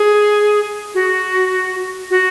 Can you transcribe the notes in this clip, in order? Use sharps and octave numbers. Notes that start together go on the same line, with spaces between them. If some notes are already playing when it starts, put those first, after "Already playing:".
Already playing: G#4
F#4
F#4